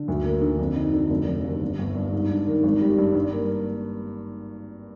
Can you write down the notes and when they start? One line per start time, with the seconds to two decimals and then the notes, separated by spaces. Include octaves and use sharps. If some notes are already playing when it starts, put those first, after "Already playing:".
Already playing: D3
0.08 D2
0.24 A#3
0.42 D3
0.59 F2
0.76 D#4
0.93 D3
1.10 F1
1.28 F1
1.45 D#2
1.61 G1
1.78 G1
1.95 G2
2.12 G#2
2.29 D4
2.47 D#3
2.63 G#1
2.81 G3
2.98 G2
3.15 G2
3.32 A#3